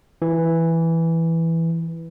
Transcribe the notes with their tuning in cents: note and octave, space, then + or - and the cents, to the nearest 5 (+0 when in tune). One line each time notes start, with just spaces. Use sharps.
E3 +0